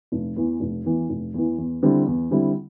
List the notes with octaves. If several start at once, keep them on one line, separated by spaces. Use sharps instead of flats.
F1
E2 E3
F1
E2 E3
F1
E2 E3
E2
D3 G3 C4 E4
E2
D3 G3 C4 E4